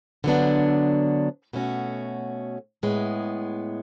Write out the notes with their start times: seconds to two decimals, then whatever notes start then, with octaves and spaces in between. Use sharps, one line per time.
0.24 D3 F#3 B3 D4
1.53 B2 A3 C#4 F#4
2.83 A2 G#3 B3